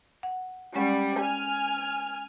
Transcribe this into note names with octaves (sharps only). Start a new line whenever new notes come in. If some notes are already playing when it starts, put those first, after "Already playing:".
F#5
G3 G#3 C#4 F#5
G#5 F6